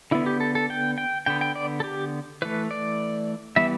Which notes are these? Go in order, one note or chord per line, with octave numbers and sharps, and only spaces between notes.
D3 B3 E4
G4
A4
A4
G5
G5
D3 B3 G5
G5
D5
A4
G4
E3 A3 B4
D5
E3 G3 B3 E5